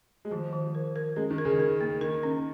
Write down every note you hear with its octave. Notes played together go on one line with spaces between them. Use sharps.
G#3
D#3 F3
D#3
A#4
A#4
G#3 C#4
D#3
A#4
C#3
A#4
A#3
D#3 A#4
C#4